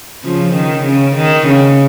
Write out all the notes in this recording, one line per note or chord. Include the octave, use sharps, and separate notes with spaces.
C#3 F3
D#3
C#3
D#3
C#3